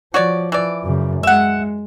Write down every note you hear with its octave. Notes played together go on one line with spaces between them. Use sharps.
F3 F#4 C#5 D5
E3 D5
F#2 C#3
G#3 E5 F#5